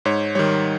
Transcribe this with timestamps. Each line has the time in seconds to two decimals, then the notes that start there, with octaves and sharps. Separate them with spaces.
0.05 G#2 C#5
0.35 D#3 G3 C#5